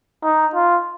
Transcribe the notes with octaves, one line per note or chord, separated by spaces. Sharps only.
D#4
F4